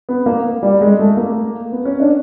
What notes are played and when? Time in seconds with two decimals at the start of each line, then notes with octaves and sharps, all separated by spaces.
0.09 B3
0.26 A#3
0.63 G3
0.81 G#3
0.99 A3
1.17 A#3
1.72 B3
1.85 C#4
2.00 D4